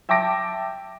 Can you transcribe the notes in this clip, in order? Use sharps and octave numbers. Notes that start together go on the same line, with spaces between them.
E5 G5 A5 D6 A#6 D7